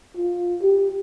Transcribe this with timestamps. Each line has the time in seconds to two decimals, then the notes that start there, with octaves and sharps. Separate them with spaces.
0.17 F4
0.62 G4